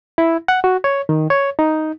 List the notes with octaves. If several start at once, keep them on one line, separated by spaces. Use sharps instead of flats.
E4
F#5
F#4
C#5
D#3
C#5
D#4